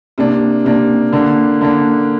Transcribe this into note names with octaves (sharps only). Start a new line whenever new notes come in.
C3 A#3 D4
C3 A#3 D4
D3 A#3 D4
D3 A#3 D4